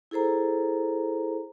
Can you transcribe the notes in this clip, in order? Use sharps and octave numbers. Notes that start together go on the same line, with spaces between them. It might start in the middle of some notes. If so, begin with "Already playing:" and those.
E4 G#4 A4 C5 A#5